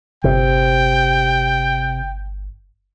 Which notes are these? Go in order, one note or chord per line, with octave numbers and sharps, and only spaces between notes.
G1 C3 G5